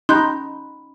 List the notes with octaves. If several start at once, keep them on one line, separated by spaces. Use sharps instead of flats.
C#4 D#4 B5 C6 F#6 G6